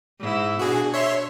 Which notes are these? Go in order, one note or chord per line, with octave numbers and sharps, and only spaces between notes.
G#2 E4
B2 D4 F#4 G#4
C#5 E5 C6